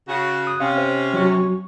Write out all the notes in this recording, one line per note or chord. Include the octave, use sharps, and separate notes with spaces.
C#3 F#4
D#6 F#6
C3 C#4 F5
C5
F#3 F#4 C#6